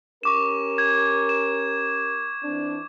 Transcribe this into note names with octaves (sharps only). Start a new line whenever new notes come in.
C#4 G4 A#4 C#6 D6 E7
G#6
E7
E3 C4 D4